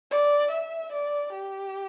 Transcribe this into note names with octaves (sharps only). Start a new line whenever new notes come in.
D5
E5
D5
G4